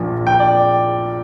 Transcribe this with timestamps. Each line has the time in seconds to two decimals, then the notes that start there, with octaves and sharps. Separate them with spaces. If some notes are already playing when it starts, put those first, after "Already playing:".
Already playing: A#1 A#2 F3
0.27 G5
0.40 D5